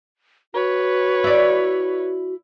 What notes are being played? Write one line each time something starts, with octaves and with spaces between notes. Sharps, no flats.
F#4 B4 C#5
E4 D5